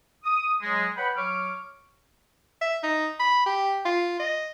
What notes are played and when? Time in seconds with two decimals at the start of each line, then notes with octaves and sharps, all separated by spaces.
0.24 D#6
0.62 F#3 G#3
0.97 B4 C#5 F#5 G5 B5
1.16 F#3 C#5 C#6 D6 F6
2.61 E5
2.83 D#4
3.20 B5
3.46 G4
3.86 F4
4.20 D#5